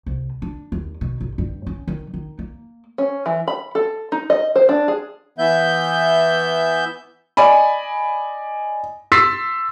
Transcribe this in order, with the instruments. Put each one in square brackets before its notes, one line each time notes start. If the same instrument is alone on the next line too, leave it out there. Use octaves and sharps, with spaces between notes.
[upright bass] C2
D4
D#2
B2
G1
G2
C#4
D#3
D#3
A#3
[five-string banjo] C#4
E3
B5
A4
D#4
D#5
C5
D4
G#4
[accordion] E3 B3 E5 G6
[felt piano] D5 D#5 G#5 B5
C6 E6 A6 B6 C7